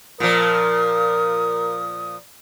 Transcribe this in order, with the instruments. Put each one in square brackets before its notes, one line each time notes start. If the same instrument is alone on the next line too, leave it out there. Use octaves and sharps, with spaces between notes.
[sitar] A#2 F3 [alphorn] A#4 [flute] D#6